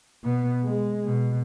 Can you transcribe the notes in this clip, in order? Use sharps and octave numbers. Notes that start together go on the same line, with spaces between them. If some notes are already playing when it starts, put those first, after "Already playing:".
B2 B3
G#3
B2